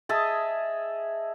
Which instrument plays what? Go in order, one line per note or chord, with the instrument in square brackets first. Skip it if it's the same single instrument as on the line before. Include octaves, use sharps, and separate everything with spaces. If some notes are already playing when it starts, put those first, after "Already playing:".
[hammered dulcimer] G#4 D#5 E5 A5